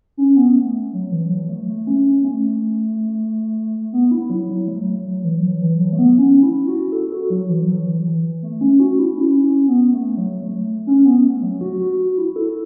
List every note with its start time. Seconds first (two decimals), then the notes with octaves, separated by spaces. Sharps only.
0.17 C#4
0.36 B3
0.56 A3
0.93 F#3
1.12 E3
1.30 F#3
1.49 A3
1.68 A3
1.87 C#4
2.05 C#4
2.24 A3
3.93 B3
4.11 E4
4.30 F#3
4.49 F#3
4.68 A3
4.87 F#3
5.05 F#3
5.24 E3
5.43 F#3
5.62 E3
5.80 F#3
5.93 A3
5.98 B3
6.18 C#4
6.43 E4
6.68 F#4
6.92 A4
7.12 F#4
7.30 F#3
7.49 E3
7.68 F#3
7.86 E3
8.06 E3
8.43 A3
8.61 C#4
8.80 F#4
8.99 E4
9.17 C#4
9.43 C#4
9.68 B3
9.93 A3
10.17 F#3
10.42 A3
10.87 C#4
11.05 B3
11.24 A3
11.42 F#3
11.61 F#4
11.80 F#4
11.99 F#4
12.18 E4
12.36 A4